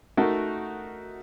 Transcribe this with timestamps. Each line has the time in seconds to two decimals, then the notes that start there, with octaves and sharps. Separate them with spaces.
0.17 A3 D#4 F#4 A#4